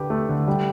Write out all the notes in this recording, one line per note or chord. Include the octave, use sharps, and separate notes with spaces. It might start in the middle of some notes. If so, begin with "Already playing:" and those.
Already playing: D3 G4 B4
A3
D3
G3